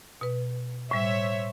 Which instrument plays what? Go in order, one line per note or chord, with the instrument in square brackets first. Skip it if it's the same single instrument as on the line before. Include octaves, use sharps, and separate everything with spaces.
[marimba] B2 B4
[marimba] A2 G3 [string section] C5 C#5 E5